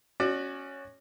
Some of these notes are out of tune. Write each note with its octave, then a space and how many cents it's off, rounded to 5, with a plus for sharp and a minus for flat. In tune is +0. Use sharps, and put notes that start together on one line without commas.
C#4 +0 F#4 +0 D5 +30